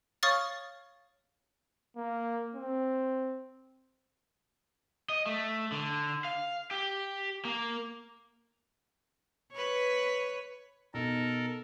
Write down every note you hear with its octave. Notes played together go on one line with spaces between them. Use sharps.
C#5 F5 C#6 D#6 F6 A6
A#3
C4
D#5
A3
D3
F5
G4
A#3
B4 C#5
B2 D#4 A4 A#4